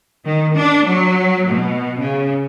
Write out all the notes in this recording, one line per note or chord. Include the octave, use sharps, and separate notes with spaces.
D#3
D4
F#3
B2
C#3